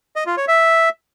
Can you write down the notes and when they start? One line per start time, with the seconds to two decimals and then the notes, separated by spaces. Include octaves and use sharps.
0.16 D#5
0.27 F4
0.37 C#5
0.48 E5